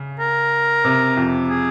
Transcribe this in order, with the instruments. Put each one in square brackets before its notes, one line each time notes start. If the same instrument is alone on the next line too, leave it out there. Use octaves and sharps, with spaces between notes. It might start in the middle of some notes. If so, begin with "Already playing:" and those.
Already playing: [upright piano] C#3
[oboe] A#4
[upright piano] C3
F2
[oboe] G#4